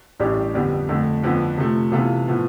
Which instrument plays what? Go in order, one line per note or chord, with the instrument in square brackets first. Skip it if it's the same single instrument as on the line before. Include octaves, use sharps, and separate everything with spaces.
[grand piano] A1 A2 G3 D4 G4
F2 D3 G3 B3
F2 D3 A3
F2 D3 F3 B3
C3 F3 A3
C3 E3 B3 F4 A4
A2 F3 B3